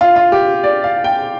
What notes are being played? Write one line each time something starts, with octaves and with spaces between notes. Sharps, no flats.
F4
F4
G4
D5
F5
G5